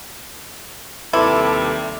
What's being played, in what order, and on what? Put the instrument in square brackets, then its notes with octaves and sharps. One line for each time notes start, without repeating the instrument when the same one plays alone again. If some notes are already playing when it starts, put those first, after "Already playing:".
[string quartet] D#2 C3 G3 [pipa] E4 [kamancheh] A4 [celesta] B4 C6 D6